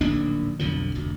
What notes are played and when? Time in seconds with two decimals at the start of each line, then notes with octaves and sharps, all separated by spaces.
0.01 D1 A#1 D#2 D4
0.59 B1 F2 D3 F3
0.95 F1 D2